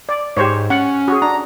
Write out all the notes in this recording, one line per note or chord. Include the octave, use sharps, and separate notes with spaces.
D5
G#2 G4 C5 C#5
C#4 F#5
F#4 G#4
D4 A#5